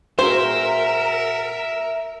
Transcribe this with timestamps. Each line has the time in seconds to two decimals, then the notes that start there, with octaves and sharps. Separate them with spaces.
0.19 A#2 F#4 G#4 A#4 C5 E5